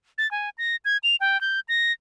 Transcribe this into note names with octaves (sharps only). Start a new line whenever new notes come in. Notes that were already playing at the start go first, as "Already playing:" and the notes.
A6
G#5
A#6
G#6
F7
G5
G6
A#6